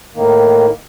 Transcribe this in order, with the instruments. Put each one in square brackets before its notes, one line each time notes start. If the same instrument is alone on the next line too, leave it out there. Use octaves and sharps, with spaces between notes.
[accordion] A2 D#3 A#3